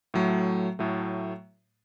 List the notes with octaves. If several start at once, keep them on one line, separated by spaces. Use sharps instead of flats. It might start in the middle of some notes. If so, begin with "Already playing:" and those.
A2 F#3 A3
A2 F#3 A3